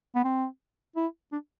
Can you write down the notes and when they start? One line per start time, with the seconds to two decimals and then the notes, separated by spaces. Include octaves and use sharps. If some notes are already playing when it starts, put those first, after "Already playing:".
0.15 B3
0.25 C4
0.96 E4
1.32 D4